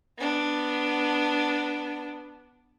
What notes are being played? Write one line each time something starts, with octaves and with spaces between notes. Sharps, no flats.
B3 D4